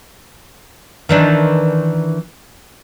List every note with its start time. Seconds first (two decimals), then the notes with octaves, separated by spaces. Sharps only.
1.09 D#3 E3 D4